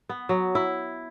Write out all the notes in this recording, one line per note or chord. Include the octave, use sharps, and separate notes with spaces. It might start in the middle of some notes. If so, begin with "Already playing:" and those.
B3
F#3
E4